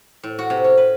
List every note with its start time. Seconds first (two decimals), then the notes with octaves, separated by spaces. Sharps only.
0.23 A2
0.39 F#4
0.50 C3
0.64 C#4
0.78 B4